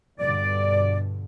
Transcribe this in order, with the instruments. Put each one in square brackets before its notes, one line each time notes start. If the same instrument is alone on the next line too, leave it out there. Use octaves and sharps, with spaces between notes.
[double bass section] G2 B2 D3 [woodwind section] D5